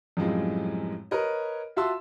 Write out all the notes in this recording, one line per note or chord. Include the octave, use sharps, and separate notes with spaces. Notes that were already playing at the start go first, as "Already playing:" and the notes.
F#2 A2 F3 G3 G#3 C4
A#4 B4 C#5 D#5
F4 F#4 E5 A5 C6 E6